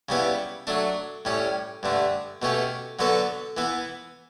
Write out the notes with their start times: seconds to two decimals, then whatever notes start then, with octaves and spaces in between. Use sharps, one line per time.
0.09 C#3 G3 B3 E4
0.67 F#3 A3 D4
1.25 A2 G3 C#4
1.83 G2 D3 A3
2.42 B2 A3 C#4 G4
2.99 D3 F#3 B3 F#4 A4
3.57 E3 B3 E4